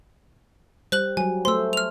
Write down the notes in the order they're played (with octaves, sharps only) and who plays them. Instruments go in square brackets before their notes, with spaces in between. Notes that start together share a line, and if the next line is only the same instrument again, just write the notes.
[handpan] G3 [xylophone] C5 F#6 F#7
[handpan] F#3 G3 [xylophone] G#5
[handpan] A3 C5 [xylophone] C6 E6
[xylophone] F6 F7